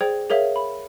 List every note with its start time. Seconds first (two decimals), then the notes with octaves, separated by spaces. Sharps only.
0.01 G#4 C5 D5 G5 G#6
0.30 G#4 A#4 C#5 E5 F5
0.56 B5